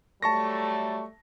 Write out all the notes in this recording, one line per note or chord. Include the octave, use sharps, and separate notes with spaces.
F#3 G3 A3 A5 C#6 A#6